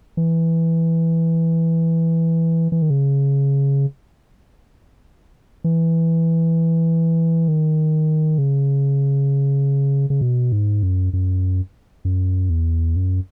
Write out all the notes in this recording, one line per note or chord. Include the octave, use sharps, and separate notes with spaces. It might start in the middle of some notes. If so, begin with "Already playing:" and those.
E3
E3
D#3
C#3
E3
D#3
C#3
C#3
B2
G#2
F#2
F#2
F#2
E2
F#2